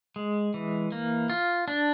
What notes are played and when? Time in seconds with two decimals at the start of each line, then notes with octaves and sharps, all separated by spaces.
0.16 G#3
0.54 E3
0.92 A#3
1.30 F4
1.68 D4